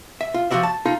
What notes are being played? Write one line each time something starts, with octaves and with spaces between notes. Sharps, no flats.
E5
F4
F3 G3 F#4 D5 E5
A5
D#4 F4 A4